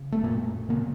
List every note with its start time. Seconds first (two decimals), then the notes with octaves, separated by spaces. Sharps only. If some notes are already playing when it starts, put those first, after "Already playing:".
Already playing: C#3
0.12 A3
0.23 F#2 A#2 A#3
0.69 A#2 C#3 A#3